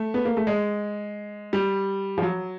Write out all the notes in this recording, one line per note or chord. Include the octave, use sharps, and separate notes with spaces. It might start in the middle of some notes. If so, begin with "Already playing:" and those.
Already playing: A3
B3
A#3
A3
G#3
G3
F3
F#3